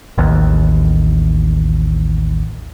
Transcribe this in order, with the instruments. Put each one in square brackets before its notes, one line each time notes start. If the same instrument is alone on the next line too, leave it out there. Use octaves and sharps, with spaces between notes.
[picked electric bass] A1 D#2